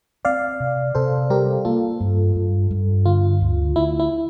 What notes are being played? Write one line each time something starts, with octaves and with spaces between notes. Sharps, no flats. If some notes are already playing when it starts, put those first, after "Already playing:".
C4 D5 F5
C3
C3 A4 C5
G3 G4 A#4
A#3 F4 A4
G2
G2
G2
D3 F4
D2
D2 E4
E4